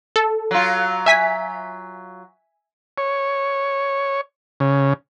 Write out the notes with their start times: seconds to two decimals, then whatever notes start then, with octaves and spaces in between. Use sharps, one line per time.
0.16 A4
0.51 F#3 F4
1.06 E5 G#5 B6
2.98 C#5
4.60 C#3